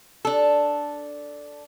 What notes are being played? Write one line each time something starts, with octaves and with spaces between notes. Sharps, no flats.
D4 A4